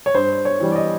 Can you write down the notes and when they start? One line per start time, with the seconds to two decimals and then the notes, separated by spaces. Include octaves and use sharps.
0.06 C#5
0.15 G2 C5
0.45 C#5
0.60 E3 G3
0.72 D5
0.76 D#5